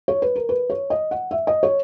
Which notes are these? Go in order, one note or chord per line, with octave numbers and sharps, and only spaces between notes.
C#5
B4
A#4
B4
C#5
D#5
F#5
E5
D#5
C#5